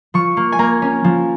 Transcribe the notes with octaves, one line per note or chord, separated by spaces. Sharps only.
F3 C#6
A#3
G#5
A#3 A#5
C#4
F3